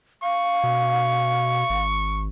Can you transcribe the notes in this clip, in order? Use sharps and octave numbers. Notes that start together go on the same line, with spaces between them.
F5 C#6
B2
G#1